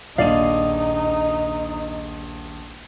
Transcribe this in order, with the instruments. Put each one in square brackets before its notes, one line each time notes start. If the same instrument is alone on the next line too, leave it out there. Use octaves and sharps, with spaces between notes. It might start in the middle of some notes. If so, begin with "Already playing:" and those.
[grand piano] D#1 A#1 D#7 [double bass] D#4 [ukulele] D5 F5